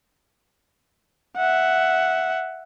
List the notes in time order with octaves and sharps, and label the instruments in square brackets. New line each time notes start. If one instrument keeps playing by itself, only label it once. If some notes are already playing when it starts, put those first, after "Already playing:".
[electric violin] E5 F#5